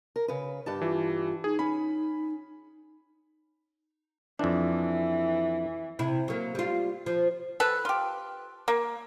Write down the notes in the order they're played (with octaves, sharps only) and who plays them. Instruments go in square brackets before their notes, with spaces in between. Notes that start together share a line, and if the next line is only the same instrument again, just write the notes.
[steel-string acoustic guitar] A#4
C#3 B4
G2 G4 A5
[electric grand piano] E3 [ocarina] F4
[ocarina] D#4 [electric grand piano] G#4
[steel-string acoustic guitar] C#4 [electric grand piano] B5
[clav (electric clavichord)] F2 D4 [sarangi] E3
[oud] C3 E4
F#3 A#3
G3 F4
F3
[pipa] A4 B4
F4 G4
A#3